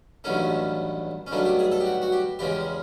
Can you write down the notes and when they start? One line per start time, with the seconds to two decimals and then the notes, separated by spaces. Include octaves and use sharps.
0.24 A1 G2 D#3 F#3 A3 C#4
1.27 C#4
1.31 G2 D#3 F#3 A3 D4
1.46 G4
1.59 G#4
1.72 A4
1.80 G4
1.85 F#4
2.02 F#4
2.12 G4
2.39 E2 C#3 F3 G#3 G4